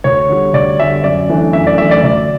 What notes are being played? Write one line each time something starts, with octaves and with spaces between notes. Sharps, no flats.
D2 C#5
D3 G3
D2 D5
D3 G3 E5
F#2 D5
E3 A3 D4
F#2 E5
D5
E3 A3 D4 E5
D5
D2 D5